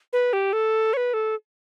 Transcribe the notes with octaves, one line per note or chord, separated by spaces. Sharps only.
B4
G4
A4
C#5
B4
A4